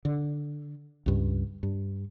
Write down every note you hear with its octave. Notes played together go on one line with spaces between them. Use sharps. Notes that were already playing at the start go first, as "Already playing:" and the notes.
D3
C#2 G2
G2